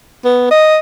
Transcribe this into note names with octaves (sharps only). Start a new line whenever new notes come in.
B3
D#5